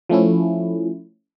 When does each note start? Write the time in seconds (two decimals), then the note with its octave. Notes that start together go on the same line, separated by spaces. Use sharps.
0.09 F3 A3 C#4 E4